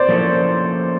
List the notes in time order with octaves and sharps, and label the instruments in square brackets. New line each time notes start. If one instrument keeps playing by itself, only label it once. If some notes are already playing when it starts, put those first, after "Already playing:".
Already playing: [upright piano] C5 D5
[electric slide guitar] F3 A#3 C#4 E4 A4